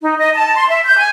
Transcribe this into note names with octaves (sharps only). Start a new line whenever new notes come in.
D#4
D#5
A5
C6
E5
G6
G#5